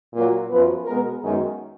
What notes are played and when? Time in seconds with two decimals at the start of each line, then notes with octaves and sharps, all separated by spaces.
0.13 A#2 F#3 A#3
0.49 F#2 F3 B3 B4
0.85 B2 G#3 B3 A#4
1.22 F#2 D#3 G#3 B3 G#4